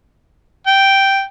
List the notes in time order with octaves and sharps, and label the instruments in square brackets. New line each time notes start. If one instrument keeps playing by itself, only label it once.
[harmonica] G5